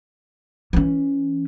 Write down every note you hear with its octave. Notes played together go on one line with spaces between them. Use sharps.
E3 C#4